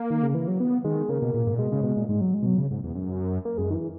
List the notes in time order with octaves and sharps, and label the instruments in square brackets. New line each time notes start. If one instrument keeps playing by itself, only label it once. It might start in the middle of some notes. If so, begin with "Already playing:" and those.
Already playing: [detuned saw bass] A#3
[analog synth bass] D#3
C#3
E3
F#3
[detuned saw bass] B3
[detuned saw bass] D#3 [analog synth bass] G#3
[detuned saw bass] C#3 [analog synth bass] A#3
[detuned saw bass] B2
A#2
G#2
A#2
[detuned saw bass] B2 [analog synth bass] G#3
[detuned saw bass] C#3
B2
A#2
[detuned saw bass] G#2 [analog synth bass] G#3
[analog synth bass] F#3
G#3
[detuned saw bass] B2 [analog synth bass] F#3
[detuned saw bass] C#3
G#2
E2
F#2
[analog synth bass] A#3
[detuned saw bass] F#2 [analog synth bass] G#3
[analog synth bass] D#3
E3